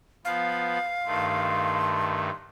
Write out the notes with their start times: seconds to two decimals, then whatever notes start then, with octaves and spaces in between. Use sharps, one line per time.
0.25 F3 B3 F5
1.06 G2 D#3 A3 C6